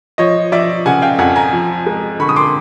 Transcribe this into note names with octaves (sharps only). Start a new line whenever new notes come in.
F3 C#5 D#5
F3 D5 E5
C#3 F#5 G#5
F5 G5
F2 F#5 G#5
G#5 A#5
F3
G#3
D3 B5 C#6
D#6
C6 D6